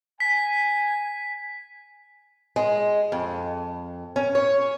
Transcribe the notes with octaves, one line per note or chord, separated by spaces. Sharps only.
G#5 B6
G#3
F2
C#4
C#5